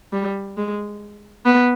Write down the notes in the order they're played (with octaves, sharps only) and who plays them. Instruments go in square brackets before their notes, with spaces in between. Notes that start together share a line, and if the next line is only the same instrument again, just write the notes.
[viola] G3
G#3
B3